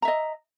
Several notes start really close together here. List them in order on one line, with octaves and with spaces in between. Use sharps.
A#5 E5 D#5